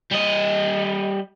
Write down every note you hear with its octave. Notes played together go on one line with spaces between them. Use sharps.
G3 D#5